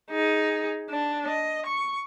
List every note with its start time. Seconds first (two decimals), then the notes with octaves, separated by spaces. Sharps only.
0.11 D#4 G#4
0.90 D4
1.27 D#5
1.66 C#6